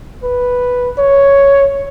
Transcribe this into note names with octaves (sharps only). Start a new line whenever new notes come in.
B4
C#5